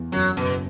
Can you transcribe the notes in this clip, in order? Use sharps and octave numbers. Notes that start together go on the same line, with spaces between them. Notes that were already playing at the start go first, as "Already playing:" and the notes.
Already playing: E2
F#2 F#3
F#1 B2